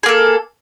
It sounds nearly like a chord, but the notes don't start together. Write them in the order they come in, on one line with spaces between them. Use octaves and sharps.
G#4 A#3 A4